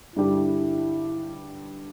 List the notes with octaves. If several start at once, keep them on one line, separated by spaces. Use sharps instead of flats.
G2 D3 G3 D4 E4 G4